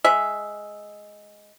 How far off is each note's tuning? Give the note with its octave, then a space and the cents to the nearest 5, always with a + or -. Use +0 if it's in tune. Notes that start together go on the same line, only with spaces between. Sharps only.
G#3 +0 E5 +0